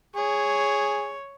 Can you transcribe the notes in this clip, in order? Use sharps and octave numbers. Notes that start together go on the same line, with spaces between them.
G#4 C#5